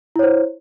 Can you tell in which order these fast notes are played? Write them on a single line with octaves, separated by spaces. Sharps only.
E4 C#5 C5